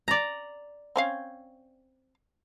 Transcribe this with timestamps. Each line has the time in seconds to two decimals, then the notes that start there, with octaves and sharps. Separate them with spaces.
0.08 D5 A#5
0.96 C4 C#4 F5